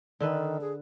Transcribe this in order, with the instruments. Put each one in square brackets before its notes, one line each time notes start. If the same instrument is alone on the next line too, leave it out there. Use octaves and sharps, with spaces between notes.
[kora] D3 A4 B4 [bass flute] D#3
[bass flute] G#4